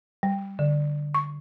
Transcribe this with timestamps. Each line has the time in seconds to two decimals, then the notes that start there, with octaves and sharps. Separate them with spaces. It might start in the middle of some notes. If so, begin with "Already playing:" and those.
0.23 G3
0.59 D3
1.14 C#6